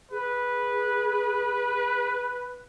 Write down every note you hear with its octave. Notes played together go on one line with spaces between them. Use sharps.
G#4 B4